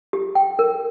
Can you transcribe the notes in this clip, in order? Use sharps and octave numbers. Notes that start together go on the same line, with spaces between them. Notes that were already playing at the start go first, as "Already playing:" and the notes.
G4
G5
A#4